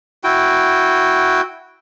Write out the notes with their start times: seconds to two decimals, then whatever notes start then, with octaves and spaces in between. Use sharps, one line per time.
0.24 E4 F#4 G5